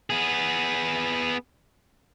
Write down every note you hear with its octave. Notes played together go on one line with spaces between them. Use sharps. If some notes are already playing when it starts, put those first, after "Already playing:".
B3 G#4